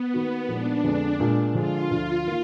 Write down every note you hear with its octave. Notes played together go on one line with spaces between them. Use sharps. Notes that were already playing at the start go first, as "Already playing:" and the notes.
Already playing: B3
D#3 A#3 D#4 F#4
A#2 F3 G#3 D4 D#4
F2 D3 G#3 B3
A#2 G#3 D4
D3 F3 G#3 F4
D2 D3 F3 F4
D#3 A#3